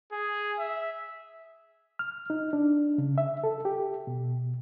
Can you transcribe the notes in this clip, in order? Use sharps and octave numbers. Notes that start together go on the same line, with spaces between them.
G#4
E5
F6
D#4
D4
C#3
E5
A4
G4
B2